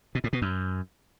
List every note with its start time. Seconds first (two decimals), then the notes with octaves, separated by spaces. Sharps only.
0.15 B2
0.24 A2
0.33 B2
0.42 F#2